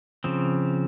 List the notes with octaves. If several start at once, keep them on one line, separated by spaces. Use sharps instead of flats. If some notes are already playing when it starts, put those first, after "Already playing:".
C#3 F3 C4